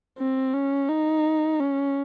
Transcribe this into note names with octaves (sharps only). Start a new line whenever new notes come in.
C4
C#4
D#4
C#4